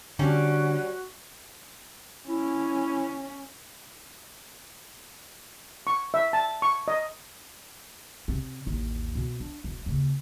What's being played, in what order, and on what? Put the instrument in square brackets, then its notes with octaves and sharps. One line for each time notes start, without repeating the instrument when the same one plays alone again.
[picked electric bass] D3 [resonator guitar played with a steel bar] G3 C#4 [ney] F#4
[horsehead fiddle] C#4 [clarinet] E4
[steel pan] C#6
E5
A5
C#6
D#5
[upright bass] C3 C4
A1 D#2
B2 B3
D4
E1
D#2 C#3